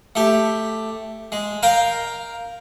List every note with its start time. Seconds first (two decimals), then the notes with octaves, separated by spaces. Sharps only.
0.15 A3 G4
1.32 G#3
1.63 A#4 F5 G5 A#5